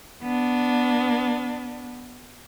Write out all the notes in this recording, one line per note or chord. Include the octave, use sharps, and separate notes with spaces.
B3 D4